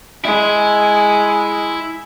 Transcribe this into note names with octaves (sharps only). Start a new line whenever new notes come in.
G#3 E4